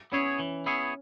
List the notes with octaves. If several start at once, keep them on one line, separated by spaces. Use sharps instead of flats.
B3 C#4 E4 G#4 C#5
E3
B3 E4 G#4 C#5